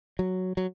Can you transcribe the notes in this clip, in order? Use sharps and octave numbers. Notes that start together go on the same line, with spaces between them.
F#3
F#3